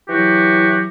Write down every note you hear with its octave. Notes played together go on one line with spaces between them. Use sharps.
E3 F#3 F#4 G4